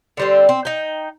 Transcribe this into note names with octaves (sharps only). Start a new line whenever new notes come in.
D3 G3 C4
C4
D#4 G5